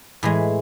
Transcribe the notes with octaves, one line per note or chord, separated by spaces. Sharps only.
A2 E3 G#3